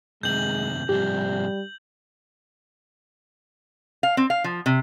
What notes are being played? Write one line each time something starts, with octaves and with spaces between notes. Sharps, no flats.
F#2 C3 D#3 G#3 G6 F#7
G#2 C3 F3 G3 G4
F5
C4
F5
F3
C3